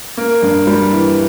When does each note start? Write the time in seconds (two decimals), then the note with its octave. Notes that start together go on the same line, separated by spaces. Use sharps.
0.17 A#3
0.42 G2
0.67 G3
0.92 E3